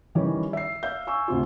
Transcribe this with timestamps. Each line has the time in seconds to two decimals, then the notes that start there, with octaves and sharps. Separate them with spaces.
0.15 D#3 E3 G3 C#4
0.53 E5 C7
0.83 E5 F5 G6
1.07 G#5 C#6 E6
1.28 D2 C3 F4